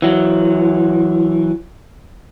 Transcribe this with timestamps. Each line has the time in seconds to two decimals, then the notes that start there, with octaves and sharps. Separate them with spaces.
0.02 E3 F#3